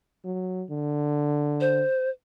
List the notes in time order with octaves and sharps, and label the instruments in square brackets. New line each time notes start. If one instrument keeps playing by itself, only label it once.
[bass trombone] F#3
D3
[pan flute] C5